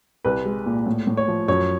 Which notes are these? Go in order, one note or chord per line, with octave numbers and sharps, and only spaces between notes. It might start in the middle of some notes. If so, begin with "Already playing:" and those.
C2 B4
G#3
A#2
A2
A2
C#5
F3
F#2 C#5